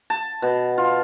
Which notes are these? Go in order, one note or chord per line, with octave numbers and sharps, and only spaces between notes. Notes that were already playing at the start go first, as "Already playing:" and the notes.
A5
B2
F4